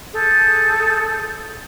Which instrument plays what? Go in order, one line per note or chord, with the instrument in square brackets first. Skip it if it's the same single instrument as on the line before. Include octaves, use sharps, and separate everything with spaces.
[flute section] G#4 A4 G6